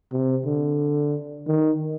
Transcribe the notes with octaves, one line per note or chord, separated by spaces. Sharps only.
C3
D3
D#3